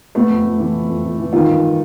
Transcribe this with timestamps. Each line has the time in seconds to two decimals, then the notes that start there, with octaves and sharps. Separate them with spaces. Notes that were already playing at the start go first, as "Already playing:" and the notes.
0.15 C3 A3 B3
0.30 F2
0.45 F2
0.59 E3
0.74 C3
0.89 F2
1.04 F2
1.19 E3
1.33 D#3 D#4 F4
1.48 G2